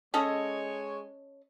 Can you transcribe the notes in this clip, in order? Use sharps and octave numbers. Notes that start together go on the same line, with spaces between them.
G#3 C#4 A4 C#5 D#5